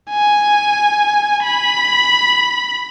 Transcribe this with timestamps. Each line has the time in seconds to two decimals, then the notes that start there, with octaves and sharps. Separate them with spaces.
0.11 G#5
1.43 B5